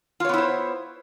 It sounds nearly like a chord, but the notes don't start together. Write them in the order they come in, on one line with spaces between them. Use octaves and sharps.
F4 C#5 B3 E4 C5